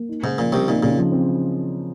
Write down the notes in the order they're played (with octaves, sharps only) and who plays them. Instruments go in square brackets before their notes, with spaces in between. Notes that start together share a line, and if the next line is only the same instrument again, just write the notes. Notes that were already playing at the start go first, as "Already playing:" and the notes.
Already playing: [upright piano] A#3
D#4
[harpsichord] G#2 [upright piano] C#3
[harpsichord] A#2 [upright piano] F3
[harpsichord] C2 C3 [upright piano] C4
[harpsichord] A#2 [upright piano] D#4
[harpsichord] A#2 [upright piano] C#3
[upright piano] F3
C4